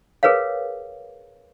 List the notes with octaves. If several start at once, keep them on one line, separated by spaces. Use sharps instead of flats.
G#4 A#4 B4 C#5 F5